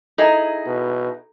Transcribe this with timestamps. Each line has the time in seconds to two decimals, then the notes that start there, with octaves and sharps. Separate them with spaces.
0.18 D#4 E4 G#4 A4 A#5
0.67 B2